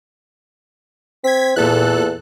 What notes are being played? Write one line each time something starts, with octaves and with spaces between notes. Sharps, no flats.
C4 G#6 B6
E2 A#2 A4 F#6